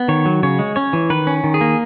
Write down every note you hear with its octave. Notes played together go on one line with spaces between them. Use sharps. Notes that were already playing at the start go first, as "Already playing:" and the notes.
Already playing: B3
D#3 C#5
F#3
C#3 C#5
G#3
C#4 C#5
E3
D#3 B4
C#4
D#3
G#4
A#3